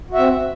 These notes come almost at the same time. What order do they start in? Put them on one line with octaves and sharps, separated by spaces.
F#4 E5 C4